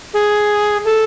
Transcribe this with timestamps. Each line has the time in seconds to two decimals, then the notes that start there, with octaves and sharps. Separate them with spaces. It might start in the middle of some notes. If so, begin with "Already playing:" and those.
0.14 G#4
0.85 A4